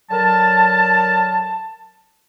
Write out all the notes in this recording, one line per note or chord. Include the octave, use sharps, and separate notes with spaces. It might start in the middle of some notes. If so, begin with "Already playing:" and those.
D3 F#3 A#4 A5